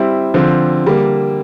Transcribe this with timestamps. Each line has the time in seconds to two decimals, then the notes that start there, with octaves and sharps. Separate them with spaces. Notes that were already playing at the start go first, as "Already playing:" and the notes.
Already playing: G3 C4 E4
0.34 D3 F3 C4
0.85 D3 G3 A#3